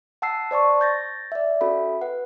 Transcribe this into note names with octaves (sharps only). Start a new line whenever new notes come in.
F#5 A5 E6 C7
C5 D5 A5 C#6
G6 A6 A#6
D5 E5
C#4 F#4 A4 E5 B5
B4 F#5